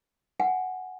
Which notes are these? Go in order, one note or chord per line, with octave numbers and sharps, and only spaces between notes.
F#5 G#5